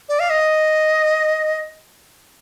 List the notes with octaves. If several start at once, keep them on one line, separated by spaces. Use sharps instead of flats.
D5
F5
D#5